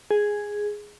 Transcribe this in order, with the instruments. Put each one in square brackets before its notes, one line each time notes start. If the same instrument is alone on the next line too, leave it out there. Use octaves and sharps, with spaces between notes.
[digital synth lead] G#4